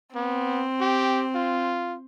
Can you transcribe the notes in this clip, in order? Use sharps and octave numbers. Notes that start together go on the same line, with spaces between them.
B3 C4
G4
F4